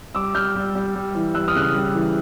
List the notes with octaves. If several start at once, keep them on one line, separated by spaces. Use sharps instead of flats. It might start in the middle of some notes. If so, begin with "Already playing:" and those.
G3 D6 E6
G3 F6 G6
G3
G3
G3
E3
G3 E6 F#6
D#6 F6
C#3 F#6
D#6 F6
G3
E3